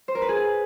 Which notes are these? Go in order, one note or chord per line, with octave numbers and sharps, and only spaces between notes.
C5
A#4
B4
G#4